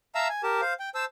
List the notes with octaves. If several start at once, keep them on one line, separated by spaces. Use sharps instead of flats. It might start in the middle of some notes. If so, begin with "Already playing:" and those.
E5 F5 A5 A#5 E6
G#5
G4 A#4 A5
C5 F5
G5
C5 A5 E6